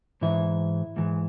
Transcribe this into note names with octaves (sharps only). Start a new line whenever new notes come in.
G#2 E3 E4 E5
G#2 E3